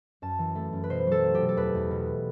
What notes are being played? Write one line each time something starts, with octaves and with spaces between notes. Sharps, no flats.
F#2 A5
E3
A3
F#2
B4
B2 C5
F#3 A4
A3
G4
B2
A4
E2 B4
E2
B2